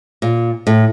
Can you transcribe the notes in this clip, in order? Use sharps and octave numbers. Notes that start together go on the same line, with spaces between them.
A#2
A2